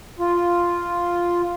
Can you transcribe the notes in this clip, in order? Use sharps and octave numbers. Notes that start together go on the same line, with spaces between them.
F4